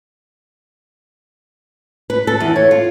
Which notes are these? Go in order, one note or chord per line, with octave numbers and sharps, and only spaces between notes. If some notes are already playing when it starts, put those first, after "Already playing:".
B4
A4
E2
C#5
F4